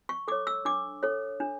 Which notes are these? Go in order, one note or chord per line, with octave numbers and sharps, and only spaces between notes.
C#6
A4 C#5 D6
E6
D4 D6
A4 C#5
D4